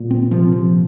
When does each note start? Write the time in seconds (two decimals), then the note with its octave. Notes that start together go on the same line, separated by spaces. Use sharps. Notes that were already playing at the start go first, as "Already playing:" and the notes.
Already playing: A#2
0.11 C4
0.31 C3 F3
0.52 F3